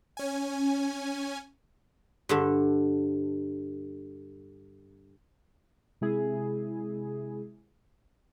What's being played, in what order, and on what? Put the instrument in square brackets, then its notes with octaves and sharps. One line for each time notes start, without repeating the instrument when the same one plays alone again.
[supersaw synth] C#4 G#5
[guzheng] G2 D3 A4
[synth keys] C3 G#3 E4 G#4